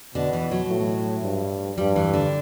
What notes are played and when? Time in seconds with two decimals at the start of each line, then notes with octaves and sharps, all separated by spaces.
0.15 B2 D3
0.33 E3
0.51 F#3
0.69 A2
1.23 G2
1.78 G2 G3
1.96 E3
2.13 D3